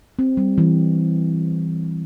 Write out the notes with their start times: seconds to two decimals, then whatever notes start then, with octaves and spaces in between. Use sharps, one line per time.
0.19 C4
0.37 G3
0.58 E3